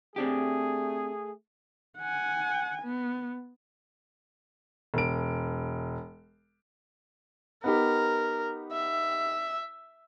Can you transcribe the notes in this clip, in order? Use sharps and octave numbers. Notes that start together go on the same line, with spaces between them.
A3 C4 D4 G4 G#4
F#5 G#5
B3
E1 D7
B3 D#4 G4 A#4
E5